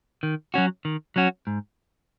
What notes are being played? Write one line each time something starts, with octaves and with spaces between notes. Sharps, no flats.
D#3
F#3 C#4 F#4
D#3
F#3 C#4 F#4
G#2